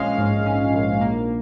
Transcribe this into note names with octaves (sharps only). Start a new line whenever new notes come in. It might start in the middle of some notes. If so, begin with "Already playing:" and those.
Already playing: A#1 G#3 C#4 F5
G#2
C#4
A#1
A#3